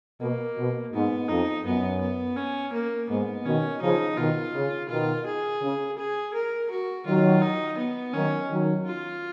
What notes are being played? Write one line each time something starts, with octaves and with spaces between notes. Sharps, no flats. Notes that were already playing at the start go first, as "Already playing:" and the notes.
B2 A#3
B2
G#2 B3
F2 D#4
F#2 B3
B3
C#4
A#3
G#2 B3
B2 D#3 C#4
C#3 F3 D#4
B2 D#3 F4
C#3
B2 D#3 F4
G#4
C#3
G#4
A#4
F#4
D#3 F#3 F4
D#4
B3
D#3 F#3 C#4
D#3 F#3
F4